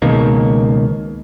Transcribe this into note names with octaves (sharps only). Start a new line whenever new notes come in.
C#2 B2 D#3 A#3